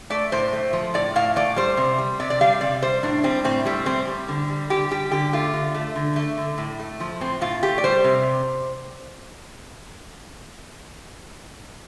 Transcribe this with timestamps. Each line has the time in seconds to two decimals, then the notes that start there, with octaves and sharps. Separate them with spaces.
0.10 A3 D5
0.32 A2 C5
0.53 A3
0.73 F3
0.94 A2 D5
1.16 A2 F5
1.36 A3 D5
1.56 G3 C5
1.77 C3
1.98 G3
2.20 C3 D5
2.30 D5
2.41 G3 F5
2.61 C3 D5
2.82 G3 C5
3.03 A2 D4
3.24 G3 C4
3.44 A2 C4
3.65 G3 A3
3.86 A2 C4
4.07 G3
4.28 D3
4.50 G3
4.70 D3 G4
4.91 G3 G4
5.12 D3 G4
5.33 A3 F4
5.53 D3
5.74 A3
5.95 D3
6.16 A3
6.38 D3
6.58 A2
6.79 A3
7.00 F3
7.20 A2 C4
7.41 A2 F4
7.63 A3 G4
7.78 D5
7.84 G3 C5
8.04 C3